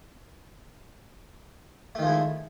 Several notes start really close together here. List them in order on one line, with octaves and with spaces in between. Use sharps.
A3 D#3 F3 G#3 E4